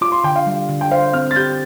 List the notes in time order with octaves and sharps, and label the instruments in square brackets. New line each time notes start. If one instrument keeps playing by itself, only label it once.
[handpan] F4 [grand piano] D6
[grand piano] C6
[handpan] D3 [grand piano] G5
[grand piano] F5
[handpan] G3
D3
[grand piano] G5
[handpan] C5 [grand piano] F5
[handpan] C4 [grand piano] F6
[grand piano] A6
[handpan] G4 [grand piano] G6